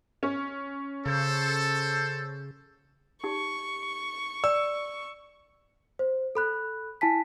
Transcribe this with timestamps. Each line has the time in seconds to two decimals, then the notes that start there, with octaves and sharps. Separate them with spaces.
0.23 C#4
1.06 C#3 A4 C5
3.24 D#4 G4 C#6
4.44 D5 E6
5.99 C5
6.35 A4 B5 F#6
7.01 E4 G#5 A5 B6